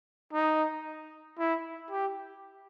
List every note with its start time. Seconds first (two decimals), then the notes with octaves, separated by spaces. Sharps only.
0.33 D#4
1.38 E4
1.91 G4